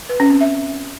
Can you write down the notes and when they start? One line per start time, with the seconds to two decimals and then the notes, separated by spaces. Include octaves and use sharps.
0.09 B4
0.20 C#4
0.30 C4
0.41 E5